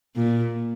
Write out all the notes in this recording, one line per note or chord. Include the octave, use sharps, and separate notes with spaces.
A#2